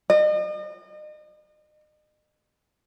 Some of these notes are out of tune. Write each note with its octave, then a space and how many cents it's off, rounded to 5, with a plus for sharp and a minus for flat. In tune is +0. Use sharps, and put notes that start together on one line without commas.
D#5 -40